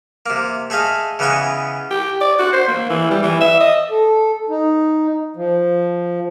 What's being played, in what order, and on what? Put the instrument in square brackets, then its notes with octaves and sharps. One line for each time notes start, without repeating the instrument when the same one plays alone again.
[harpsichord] C3 A#3
A3 G#4 D#5 F5
C#3 E3 B3 D#5 G#5 C#6
[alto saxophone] G4
D5
F#4
C5
A#3
E3
G3
E3
E5
D#5
[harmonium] A4
D#4
F3